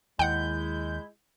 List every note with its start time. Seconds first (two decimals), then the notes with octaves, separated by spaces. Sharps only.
0.19 D#2 G#3 E4 F#5 G5 G6